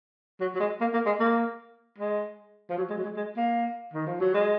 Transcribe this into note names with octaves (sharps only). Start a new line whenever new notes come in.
F#3
F#3
G#3
A#3
A#3
G#3
A#3
G#3
F3
F#3
G#3
F#3
G#3
G#3
A#3
D#3
F3
F#3
G#3